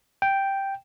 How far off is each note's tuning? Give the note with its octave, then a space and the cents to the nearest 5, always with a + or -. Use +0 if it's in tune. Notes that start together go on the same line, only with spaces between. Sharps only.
G5 +0